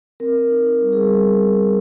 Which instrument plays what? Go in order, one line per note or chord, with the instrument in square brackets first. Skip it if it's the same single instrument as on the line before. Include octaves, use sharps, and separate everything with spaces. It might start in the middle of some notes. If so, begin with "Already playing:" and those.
[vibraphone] C4 A#4
C4
D#4
D#4
G3
G3 G#4